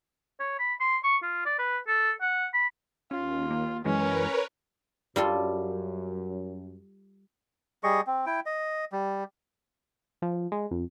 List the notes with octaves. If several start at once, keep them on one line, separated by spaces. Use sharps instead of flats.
C#5
B5
C6
C#6
F4
D5
B4
A4
F#5
B5
D#2 C#4 F4
A#3
F#2 E3 G#3 C#4 A#4 B4 C#5
F#2 G3 F4 A4
G3 G#4 D#5 C#6
C4
E4 G5
D#5
G3
F3
G#3
F2